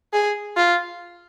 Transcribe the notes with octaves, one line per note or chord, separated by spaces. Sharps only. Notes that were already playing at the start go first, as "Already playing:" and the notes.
G#4
F4